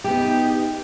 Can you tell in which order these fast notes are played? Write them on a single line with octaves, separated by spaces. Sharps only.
G4 B3 D#4